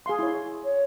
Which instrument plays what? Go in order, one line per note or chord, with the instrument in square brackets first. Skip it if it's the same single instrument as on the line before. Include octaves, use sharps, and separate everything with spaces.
[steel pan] G#4 F5 C6
E4 C#5
[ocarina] C#5